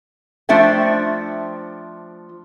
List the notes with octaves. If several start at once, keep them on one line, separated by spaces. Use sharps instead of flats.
F3 A3 D4 C5 E5 G5